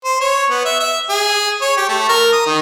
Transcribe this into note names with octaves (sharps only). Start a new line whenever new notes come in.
C5
C#5
B3
E5
E5
G#4
C#5
G4
A3
A#4
D#6
D#3